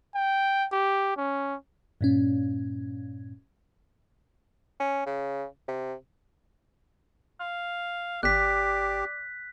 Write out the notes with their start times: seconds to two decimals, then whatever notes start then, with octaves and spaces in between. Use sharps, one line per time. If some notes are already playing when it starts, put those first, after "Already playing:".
0.15 G5
0.72 G4
1.17 C#4
2.01 G2 A#2 C#4
4.79 C#4
5.06 C#3
5.68 C3
7.40 F5
8.23 G1 G4 D5 F#6 B6